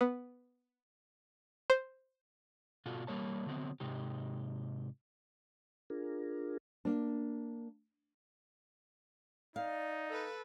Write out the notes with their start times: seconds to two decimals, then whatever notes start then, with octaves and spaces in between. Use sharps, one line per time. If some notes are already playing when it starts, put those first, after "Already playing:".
0.01 B3
1.70 C5
2.86 B2 F4 F#4 A4
3.07 G3 A#3 C#5 A5
3.46 D3 F#3 B3 C4
3.80 G#2 C3 D#4 G4
5.90 D4 F4 G#4 A#4
6.85 A#3 D4
9.56 D#4 D5 F5
10.09 A4 B4